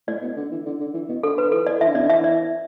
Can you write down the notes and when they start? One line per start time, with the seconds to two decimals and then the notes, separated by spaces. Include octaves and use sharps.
0.08 A2 D5
0.22 B2
0.37 D3
0.52 E3
0.66 D3
0.80 D3
0.94 E3
1.09 B2
1.23 D3 A4
1.38 B4
1.52 E3 A4
1.67 D5
1.81 E3 E5
1.88 D3
1.95 B2 D5
2.02 D3
2.10 E3 E5
2.24 D5